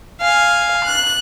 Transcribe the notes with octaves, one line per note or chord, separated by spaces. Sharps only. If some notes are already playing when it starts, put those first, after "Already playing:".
F5 G#5
F#6